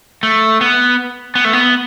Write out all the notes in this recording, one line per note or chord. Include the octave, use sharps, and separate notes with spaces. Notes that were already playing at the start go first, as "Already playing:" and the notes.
A3
B3
B3
A3
B3